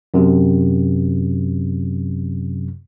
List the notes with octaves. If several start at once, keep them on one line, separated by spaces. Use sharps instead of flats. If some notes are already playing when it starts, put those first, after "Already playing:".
F#2 C3